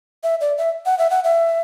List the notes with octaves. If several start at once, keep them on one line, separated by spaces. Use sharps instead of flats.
E5
D5
E5
F#5
E5
F#5
E5